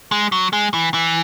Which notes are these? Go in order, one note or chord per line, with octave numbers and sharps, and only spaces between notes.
G#3
F#3
G#3
E3
E3